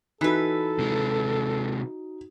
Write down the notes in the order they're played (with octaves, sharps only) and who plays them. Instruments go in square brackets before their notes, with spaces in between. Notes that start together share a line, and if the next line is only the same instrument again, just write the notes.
[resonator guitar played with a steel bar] E3 B4 [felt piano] D#4 F#4 [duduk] A4
[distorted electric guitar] C3 G#3